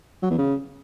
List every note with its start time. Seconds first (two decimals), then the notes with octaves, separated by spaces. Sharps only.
0.23 F#3
0.30 E2
0.38 C#3